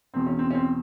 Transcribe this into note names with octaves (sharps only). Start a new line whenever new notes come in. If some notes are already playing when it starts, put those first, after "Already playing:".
E2 B2 C4
C#4
C4
C#4
C4